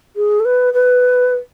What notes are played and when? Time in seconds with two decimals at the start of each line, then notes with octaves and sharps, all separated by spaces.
0.16 G#4
0.40 A4
0.45 B4
0.74 B4